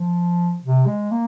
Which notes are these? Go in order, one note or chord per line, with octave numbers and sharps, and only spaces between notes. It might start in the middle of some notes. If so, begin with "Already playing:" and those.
Already playing: F3
C3
G#3
A#3